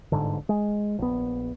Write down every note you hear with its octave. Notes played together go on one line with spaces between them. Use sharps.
G1 G#2 D3
G#3
A#1 B3